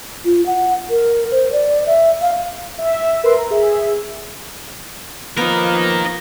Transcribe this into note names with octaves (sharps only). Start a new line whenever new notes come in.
F4
F#5
A#4
C5
D5
E5
F5
E5
A#4 B4 E5 C6
A#5
G#4 E5
F3 A#3 B3 D#4 A#4